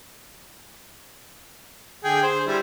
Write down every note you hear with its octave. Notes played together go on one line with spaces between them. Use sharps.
D3 G#4 G5
C5
G3 E4